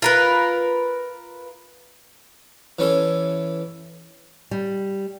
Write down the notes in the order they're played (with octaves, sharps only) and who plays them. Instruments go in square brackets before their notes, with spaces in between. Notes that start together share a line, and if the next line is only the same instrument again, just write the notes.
[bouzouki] F4 A#4 B4
[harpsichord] E3 C#4 A4
[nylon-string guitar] G3